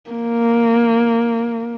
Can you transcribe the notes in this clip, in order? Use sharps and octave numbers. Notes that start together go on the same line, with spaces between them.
A#3